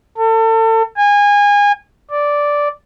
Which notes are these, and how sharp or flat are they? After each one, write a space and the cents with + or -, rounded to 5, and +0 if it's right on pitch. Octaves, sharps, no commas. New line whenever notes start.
A4 +35
G#5 -25
D5 -5